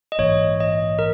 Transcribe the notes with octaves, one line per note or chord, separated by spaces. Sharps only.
D#5
A#1 G#2 E3 A#3 C#5
D#5
A#4